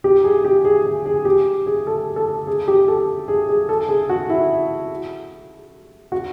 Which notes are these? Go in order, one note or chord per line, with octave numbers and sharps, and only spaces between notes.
G4
G#4
G4
G#4
G#4
G#4
G4
G#4
A4
A4
G#4
G4
A4
G#4
G#4
A4
G#4
F#4
E4
F#4